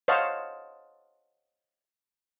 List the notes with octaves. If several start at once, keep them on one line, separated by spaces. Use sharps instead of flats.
C5 C#5 D#5 F5 F#5 A5